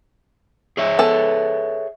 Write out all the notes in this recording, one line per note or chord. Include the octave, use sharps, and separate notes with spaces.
G#4 C#5 E5
B3 A4 G#5